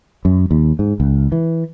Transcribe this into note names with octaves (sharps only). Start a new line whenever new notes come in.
F#2
D#2
G#2
C#2
E3